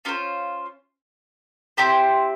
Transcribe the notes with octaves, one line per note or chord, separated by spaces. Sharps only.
C#4 F4 A4 C5
C4 E4 G4 C5